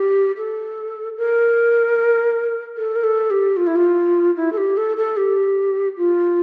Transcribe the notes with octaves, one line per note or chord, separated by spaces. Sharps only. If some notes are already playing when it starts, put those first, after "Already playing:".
Already playing: G4
A4
A#4
A4
A#4
A4
G4
F4
E4
F4
E4
A4
G4
A4
A4
G4
F4